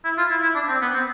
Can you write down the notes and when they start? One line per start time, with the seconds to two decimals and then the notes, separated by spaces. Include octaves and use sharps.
0.05 E4
0.18 F4
0.31 E4
0.43 E4
0.55 D4
0.69 C4
0.82 B3
0.94 C4